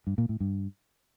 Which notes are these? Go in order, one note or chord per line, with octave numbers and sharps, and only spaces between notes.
G2
A#2
A2
G2